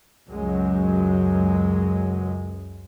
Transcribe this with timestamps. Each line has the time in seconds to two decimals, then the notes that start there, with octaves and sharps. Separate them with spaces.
0.29 C#2 F#2 F#3 G#3